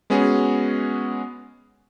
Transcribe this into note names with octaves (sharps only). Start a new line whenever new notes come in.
G#3 B3 C#4 F#4 G#4